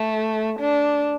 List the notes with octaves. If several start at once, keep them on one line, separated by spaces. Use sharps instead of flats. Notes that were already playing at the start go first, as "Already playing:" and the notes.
Already playing: A3
D4